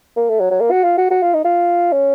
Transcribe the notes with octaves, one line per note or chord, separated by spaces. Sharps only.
A#3
A3
F#3
F#3
A#3
F#4
F4
F#4
F#4
F4
D#4
F4
C#4